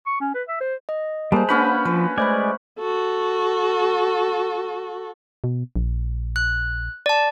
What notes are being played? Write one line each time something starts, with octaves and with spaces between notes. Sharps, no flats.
C#6
C#4
B4
E5
C5
D#5
G3 G#3 A#3 C5 A5
A#3 C#4 D4 F#4 B4 F#5 B5 G6
F3 B4
G#3 A3 C5 D5 G#5 B5
F#4 A4
B2
A#1
F#6
D5 A5